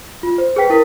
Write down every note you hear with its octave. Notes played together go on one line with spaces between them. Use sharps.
F4
C5
G#4 B4 G5 B6
E4 A#4 B6